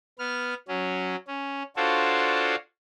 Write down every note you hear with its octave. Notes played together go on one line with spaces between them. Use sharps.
B3 F6
F#3 C#4
C#4
D4 F4 F#4 A4 C5 C#5